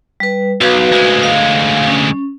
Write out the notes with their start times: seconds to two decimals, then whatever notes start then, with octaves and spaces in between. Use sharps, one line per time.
0.20 G3 B4
0.61 B1 F#4 B4 F5
0.93 D2 G#3
1.23 F5
1.88 C#4